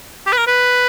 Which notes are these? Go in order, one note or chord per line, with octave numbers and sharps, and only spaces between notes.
G4
B4
A#4
B4